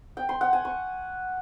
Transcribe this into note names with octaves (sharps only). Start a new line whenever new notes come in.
G5
C6
F#5
G#5
C#6